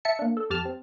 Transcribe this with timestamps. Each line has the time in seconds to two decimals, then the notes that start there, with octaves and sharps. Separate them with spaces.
0.05 E5 A5 C#7
0.19 A#3 D4
0.37 A4
0.50 F2 G4 A5 F6
0.65 C4